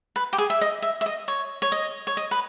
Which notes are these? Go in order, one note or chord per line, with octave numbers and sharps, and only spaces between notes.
B4
G4
G#4
E5
D#5
E5
E5
D#5
C#5
C#5
D#5
C#5
D#5
B4